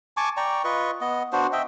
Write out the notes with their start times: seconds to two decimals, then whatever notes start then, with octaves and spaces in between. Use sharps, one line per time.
0.17 G#5 A5 C#6 D6
0.37 D5 G5 A#5 C#6
0.64 F4 B4 D#5 C#6
1.01 B3 D#5
1.33 B3 D4 F#4 C5
1.53 D#5 E5 G5